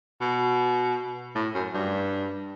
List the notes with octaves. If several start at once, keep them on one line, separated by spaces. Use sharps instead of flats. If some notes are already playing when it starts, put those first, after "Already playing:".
B2
A2
F#2
G2